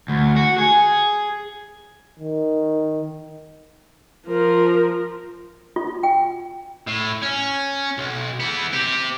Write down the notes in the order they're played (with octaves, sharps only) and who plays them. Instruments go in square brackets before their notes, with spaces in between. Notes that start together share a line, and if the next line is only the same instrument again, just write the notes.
[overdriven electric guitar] D2
F#4
G#4
[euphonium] D#3
[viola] F3 A#4
[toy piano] F4
G5
[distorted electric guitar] A2
C#4
B1
E3 B3
C4 G4